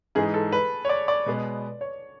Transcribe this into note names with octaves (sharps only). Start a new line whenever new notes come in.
G#2 E3 G#3 G#4
A4
B4
C#5
D5
D5
B2 G#3 B3
C#5